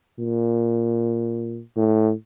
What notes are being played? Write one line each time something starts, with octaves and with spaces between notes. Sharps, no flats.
A#2
A2